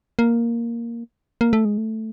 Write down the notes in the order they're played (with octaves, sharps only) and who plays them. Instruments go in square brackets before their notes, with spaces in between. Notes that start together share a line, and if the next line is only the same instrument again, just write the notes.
[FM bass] A#3
A#3
A3
G#3
A3